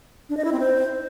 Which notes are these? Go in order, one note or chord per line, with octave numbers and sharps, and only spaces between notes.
D4
D#5
E4
C4
C5